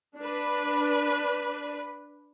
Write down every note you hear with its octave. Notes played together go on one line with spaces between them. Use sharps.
D4 B4